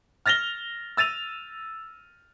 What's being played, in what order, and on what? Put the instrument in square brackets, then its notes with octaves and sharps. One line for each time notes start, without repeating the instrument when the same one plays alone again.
[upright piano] F6 A6 A#6 F7 G7
E6 A6 D#7 F7